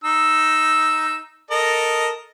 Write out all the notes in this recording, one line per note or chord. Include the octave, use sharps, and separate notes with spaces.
D#4 E6
A4 A#4 D#5